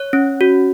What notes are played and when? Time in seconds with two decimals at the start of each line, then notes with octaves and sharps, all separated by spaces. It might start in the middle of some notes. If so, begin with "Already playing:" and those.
Already playing: C#5
0.13 C#4
0.41 F#4